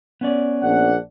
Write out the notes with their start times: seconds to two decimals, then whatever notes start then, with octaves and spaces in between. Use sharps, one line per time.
0.21 B3 C#4 D5
0.63 A#1 D4 F#5